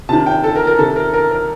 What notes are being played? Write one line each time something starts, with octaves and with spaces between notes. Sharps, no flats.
C3 D#3 A5
G5
A4
A#4
A#4
C3 D#3 A4
A#4
A#4
A#4